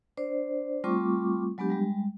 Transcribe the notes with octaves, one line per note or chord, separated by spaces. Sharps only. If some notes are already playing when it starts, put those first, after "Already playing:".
D4 C5 D5
G3 A3 C4 F4 C#6 D6
F#3 G#3 B3 D4 G4
G3 G#3